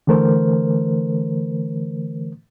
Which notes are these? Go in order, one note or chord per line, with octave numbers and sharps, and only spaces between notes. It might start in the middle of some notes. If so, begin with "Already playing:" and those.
D3 E3 A3 A#4 C5